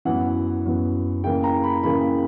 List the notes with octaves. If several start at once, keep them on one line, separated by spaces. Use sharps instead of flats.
F#2 E3 B3 F#5
F#2 E3 B3
C#3 E3 A#3 G5
A#5
B5
C#3 E3 A#3 B5